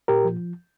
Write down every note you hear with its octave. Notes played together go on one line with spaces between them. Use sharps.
A#2 G4 A#4
F3